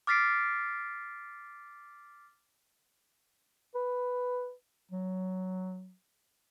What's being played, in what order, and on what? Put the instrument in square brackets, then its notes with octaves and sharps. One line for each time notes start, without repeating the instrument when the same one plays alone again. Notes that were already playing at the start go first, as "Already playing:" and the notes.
[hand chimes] D6 F6 A6 B6 C7 D7
[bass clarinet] B4
F#3